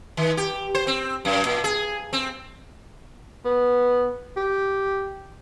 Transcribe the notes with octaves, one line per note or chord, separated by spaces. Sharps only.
D#3
G4
C5
C4
F#2
A#2
G#4
C4
B3
G4